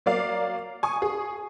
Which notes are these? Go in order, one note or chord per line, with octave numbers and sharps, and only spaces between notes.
F#3 A#3 D5 F5
G#5 C#6 D#6
G#4